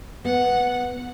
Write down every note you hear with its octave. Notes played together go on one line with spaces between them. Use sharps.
B3 F#5